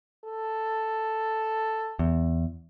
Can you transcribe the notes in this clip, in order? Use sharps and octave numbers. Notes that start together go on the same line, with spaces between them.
A4
E2